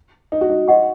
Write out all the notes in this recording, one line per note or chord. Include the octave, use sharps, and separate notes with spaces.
D#4
F#4
D#4
D#4 F#4 D#5 F#5 C#6